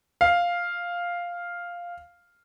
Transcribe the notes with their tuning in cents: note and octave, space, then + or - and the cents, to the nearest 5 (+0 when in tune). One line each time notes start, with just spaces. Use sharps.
F5 +0